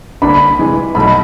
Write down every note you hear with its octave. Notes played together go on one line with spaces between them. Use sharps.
D2 D3 G3 A#3 D4 B5
C2 C3 E3 G#3
B1 B2 F#3 A3 B5